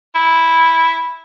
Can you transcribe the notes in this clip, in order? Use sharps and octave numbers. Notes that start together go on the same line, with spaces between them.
E4